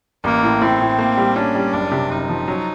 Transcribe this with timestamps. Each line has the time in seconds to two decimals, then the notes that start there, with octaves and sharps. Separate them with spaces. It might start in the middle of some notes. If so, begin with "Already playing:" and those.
0.24 A1 A#3
0.43 A2
0.61 A2 C4
0.80 A2
0.99 A#3
1.17 G3
1.36 C#4 D4
1.55 G3
1.73 F#1 D4
1.91 C3
2.10 F#1 D#4
2.29 F3
2.48 F#3